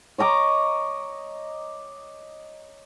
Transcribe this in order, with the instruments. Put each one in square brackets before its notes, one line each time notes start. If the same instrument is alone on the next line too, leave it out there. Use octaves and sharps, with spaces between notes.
[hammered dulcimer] C#5 D#5 A#5 D6